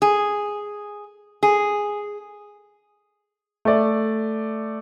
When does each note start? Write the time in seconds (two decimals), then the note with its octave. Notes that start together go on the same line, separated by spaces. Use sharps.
0.02 G#4
1.43 G#4
3.65 A3 D5